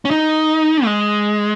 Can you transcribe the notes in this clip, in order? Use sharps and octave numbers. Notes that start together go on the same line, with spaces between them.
C#4
D#4
G#3